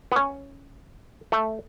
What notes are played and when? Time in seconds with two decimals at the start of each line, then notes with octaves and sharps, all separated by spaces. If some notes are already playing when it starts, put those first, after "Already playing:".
0.12 B3
0.16 C#4
1.32 A3